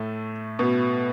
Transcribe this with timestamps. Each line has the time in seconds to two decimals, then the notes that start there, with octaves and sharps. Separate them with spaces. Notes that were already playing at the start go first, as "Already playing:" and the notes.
Already playing: A2 A3
0.59 B2 B3